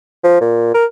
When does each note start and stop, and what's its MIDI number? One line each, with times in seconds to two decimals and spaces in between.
0.24 0.40 53
0.41 0.72 46
0.74 0.85 70